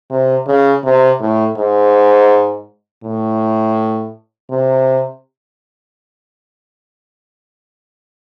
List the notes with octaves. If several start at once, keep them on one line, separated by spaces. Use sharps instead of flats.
C3
C#3
C3
A2
G#2
A2
C3